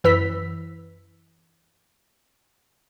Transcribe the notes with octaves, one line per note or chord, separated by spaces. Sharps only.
F#2 E3 B4 E6 B6